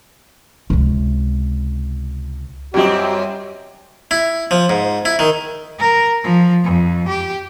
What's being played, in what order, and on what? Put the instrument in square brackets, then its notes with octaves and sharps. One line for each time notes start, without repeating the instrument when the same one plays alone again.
[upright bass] C#2 C3
[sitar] F#2 C4 D#5 [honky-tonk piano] F#3 G3 [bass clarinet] G4
[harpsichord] E4
F3
G#2
E4
D#3
[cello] A#4
F3
F2
G4